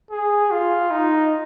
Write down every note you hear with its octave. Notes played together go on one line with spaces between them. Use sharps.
G#4
F4
D#4